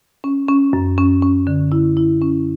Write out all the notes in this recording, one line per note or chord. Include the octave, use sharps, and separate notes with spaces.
C#4
C#4
F#2
C#4
C#4
D3
E4
E4
C#4